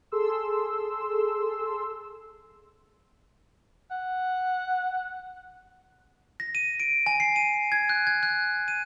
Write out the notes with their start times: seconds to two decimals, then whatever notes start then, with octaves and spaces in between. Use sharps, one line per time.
0.12 G#4 A4 C6 E6
3.91 F#5
6.40 A#6
6.55 D#7
6.80 D7
7.06 G#5
7.20 C7
7.36 D#7
7.72 G#6
7.89 F#6
8.07 G#6
8.23 F#6
8.68 D#7